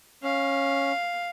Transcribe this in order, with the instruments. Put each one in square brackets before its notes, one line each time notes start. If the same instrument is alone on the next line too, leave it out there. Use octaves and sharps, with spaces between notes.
[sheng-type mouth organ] C#4 [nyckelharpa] F5